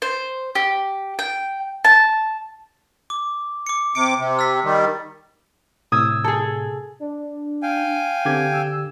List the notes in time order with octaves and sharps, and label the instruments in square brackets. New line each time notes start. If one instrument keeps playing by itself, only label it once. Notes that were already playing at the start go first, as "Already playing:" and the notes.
[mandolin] C5
G4
G5
A5
[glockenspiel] D6
D6 C#7
[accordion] C3 D6 [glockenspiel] C#7
[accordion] C3
[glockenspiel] E6 A6 B6
[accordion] D#3 G3
[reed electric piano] A2 C3 G#6 [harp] D#6 E6
[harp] G#4 A4
[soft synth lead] D4
[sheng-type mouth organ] F5 G5 G#5
[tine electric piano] D3 G4 G#6 [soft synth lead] C4
[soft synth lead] E6